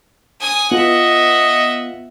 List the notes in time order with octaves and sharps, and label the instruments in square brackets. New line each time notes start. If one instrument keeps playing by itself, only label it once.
[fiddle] G#5 D#6
[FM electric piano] B3 [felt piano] F4 [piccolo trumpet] D#5 [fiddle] E5 F#5